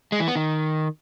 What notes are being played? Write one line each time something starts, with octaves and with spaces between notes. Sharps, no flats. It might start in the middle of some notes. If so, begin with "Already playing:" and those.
G#3
E3
B3
D#3